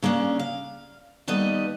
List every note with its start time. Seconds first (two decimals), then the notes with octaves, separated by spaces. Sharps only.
0.03 C#3 A#3 C#4 D4
0.39 F5
1.28 D#2 G3 B3 A4 D#5